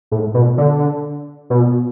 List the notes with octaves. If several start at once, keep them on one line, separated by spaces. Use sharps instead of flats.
A2
B2
D3
B2